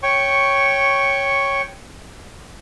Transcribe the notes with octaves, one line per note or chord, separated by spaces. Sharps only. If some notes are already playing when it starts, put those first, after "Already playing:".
C#5 G5 C#6